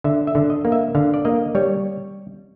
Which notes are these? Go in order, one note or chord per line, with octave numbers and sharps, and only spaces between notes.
D3 E5
E5
D3
D#5
A#3
E5
D3 F5
D5
A#3 D#5
G3 C#5